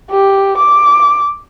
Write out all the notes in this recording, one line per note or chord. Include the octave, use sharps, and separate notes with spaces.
G4
D6